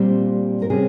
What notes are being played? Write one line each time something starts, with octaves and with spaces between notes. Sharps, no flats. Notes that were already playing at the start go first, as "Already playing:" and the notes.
Already playing: A#2 G3 C4
A#4
C3 G3 C#4 G#4